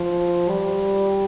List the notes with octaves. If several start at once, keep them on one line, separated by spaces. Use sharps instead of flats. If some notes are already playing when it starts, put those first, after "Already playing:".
Already playing: F3
G3